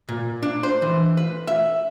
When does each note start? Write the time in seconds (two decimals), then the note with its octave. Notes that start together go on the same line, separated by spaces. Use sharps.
0.09 A#2
0.43 D4
0.63 C5
0.82 E3
1.17 B4
1.47 E5